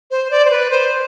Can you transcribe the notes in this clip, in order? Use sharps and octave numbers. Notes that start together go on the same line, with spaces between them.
C5
D5
C5
B4
C5